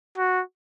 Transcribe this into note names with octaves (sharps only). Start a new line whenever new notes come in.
F#4